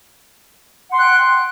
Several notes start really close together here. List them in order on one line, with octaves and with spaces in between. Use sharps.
F#5 C6 F#6 G5